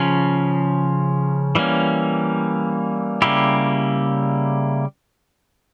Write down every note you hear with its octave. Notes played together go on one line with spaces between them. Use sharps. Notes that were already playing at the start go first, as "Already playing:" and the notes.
Already playing: C#3 F3 C#4
E3 G3 A#3 C#4
C#3 G3 A#3 E4 G4